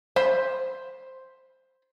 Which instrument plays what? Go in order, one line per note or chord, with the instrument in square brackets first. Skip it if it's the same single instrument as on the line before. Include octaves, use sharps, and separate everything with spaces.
[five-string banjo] C5 B5